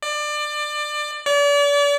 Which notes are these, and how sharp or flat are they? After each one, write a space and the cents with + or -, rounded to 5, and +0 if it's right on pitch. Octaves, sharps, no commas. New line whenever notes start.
D5 +25
D5 -40